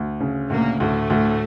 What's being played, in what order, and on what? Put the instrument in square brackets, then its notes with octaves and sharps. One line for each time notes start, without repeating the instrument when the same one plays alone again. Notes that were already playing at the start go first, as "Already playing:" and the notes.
Already playing: [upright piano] D2
C#3
[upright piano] D2 [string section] A#2 A#3
[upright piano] D2 [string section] A2 A3
[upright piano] D2